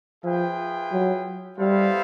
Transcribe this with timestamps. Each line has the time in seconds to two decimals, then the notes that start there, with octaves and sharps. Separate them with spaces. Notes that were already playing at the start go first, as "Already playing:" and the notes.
0.24 F3 F4 G#4 B4 E5 G5
0.92 F#3
1.59 G3 B3 E4 A4 C5 F5